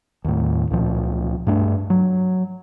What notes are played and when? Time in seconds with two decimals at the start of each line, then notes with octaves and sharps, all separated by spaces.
0.24 D#2 A2
0.70 C#2 A#2 F3
1.47 G2 A3 D4
1.90 F#3